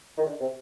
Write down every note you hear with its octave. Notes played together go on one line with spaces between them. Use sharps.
D#3
D3
C3